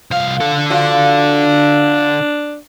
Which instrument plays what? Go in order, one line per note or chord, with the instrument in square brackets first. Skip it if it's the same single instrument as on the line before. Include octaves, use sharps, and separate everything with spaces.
[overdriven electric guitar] C2 F5 [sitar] F3
[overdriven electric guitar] D3 A4
[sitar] F3 F4 F#4 [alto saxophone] D4